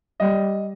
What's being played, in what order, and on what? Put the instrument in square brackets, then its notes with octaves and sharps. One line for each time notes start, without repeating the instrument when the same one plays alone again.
[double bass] G3 [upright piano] D#5